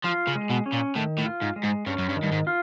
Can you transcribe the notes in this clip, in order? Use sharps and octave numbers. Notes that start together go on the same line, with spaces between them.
F3 F4
C#3
G#3
B2
C#4
A#2
A2 D#3
A2
F4
G#2
G#3
G#2
G2 C#4
F#2
G2
D#3
G2
G#2
F4